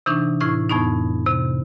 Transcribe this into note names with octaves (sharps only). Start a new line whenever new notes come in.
C3 E3 D4 D#4 C#6
A2 E4 C#6 F6 G#6
F2 A2 B3 D#4
C3